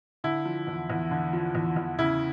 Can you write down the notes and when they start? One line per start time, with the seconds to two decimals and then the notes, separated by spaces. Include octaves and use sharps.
0.24 D3 E4
0.45 F3
0.67 E2
0.90 E2
1.11 D3
1.33 F3
1.55 E2
1.76 E2
1.99 C#3 E4